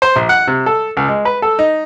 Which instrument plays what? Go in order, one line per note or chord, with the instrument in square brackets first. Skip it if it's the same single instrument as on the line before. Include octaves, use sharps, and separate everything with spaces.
[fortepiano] C5
A#1
F#5
C3
A4
C#2
G#3
B4
A4
D#4